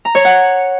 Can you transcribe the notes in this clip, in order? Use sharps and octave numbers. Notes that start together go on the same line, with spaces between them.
A#5
C#5
F#5